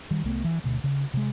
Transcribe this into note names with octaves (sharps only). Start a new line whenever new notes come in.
D#3 G3
C2 A3 B3
E3
D2 B2
C#3
C3 G#3